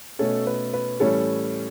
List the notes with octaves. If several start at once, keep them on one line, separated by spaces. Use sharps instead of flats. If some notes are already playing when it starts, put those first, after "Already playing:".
B2 A3 C#4 A4 C#5
B4
B4
A2 E3 G3 C#4 A4 C#5